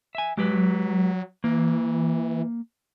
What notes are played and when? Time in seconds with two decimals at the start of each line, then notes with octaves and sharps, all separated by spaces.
0.15 E5 G#5
0.37 F#3 G#3 G4 B4
1.44 E3 A#3